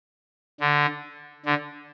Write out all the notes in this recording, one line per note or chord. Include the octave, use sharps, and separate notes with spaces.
D3
D3